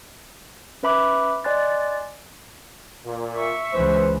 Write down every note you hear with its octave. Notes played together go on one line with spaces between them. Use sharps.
C#4 B4 E5 B5 D6 F#6
D5 D#5 G#5 C6 F#6 A6
A#2
E5 C#6
C#2 E3 B4 C5